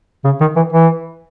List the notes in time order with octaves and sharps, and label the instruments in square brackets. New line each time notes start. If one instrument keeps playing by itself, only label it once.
[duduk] C#3
D#3
E3
E3